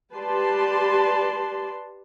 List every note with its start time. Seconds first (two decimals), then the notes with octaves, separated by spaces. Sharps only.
0.14 G4 B4 D5 A5 C6